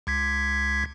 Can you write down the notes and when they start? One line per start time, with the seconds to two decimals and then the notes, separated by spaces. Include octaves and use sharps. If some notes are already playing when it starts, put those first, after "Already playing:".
0.07 C#2 G#6 B6